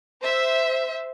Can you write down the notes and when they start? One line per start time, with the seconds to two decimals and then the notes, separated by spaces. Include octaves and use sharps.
0.21 C5 E5